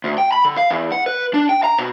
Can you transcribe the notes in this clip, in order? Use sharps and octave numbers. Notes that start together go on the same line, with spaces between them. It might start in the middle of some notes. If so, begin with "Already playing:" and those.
D2
G5
B5
D3
F5
E2
F#5
B4
D4
G5
A#5
B2